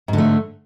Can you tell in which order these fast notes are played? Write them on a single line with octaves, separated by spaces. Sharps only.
G#2 D3 A3